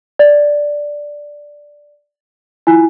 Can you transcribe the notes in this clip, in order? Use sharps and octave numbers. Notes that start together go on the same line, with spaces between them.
D5
E4 F4 G#5